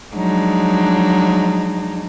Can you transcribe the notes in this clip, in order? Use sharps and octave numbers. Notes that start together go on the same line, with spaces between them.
F3 F#3 G#3 D4 D#4